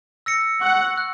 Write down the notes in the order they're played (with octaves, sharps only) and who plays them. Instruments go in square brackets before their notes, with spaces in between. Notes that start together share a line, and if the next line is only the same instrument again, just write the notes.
[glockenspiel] E6 A#6 C#7
[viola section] F#5 [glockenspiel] C#6
[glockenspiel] F#6